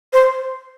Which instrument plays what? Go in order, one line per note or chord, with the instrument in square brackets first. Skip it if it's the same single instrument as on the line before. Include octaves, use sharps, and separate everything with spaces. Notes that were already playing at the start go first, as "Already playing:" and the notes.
[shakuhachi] C5